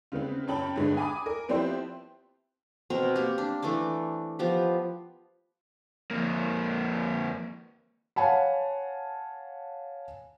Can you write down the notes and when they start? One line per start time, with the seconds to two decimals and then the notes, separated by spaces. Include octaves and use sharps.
0.12 C#3 G#3 B3 C4
0.48 F#2 C#5 G5 A5 B5 F#7
0.76 G2 D3 G#3 B3
0.97 G#5 B5 D6 D#6
1.26 A#4
1.48 F3 B3 C4 E4 G4 C5
2.90 B2 C4 A#4
3.16 A#3 G4
3.38 D4
3.62 E3 A3 D4 D6
4.39 F3 B3 G4
6.11 F2 A#3
8.16 C#5 F5 F#5 G#5 A5 B5